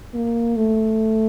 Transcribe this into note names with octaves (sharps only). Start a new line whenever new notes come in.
A#3
A3